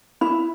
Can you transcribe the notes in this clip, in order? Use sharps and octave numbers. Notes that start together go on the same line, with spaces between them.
E4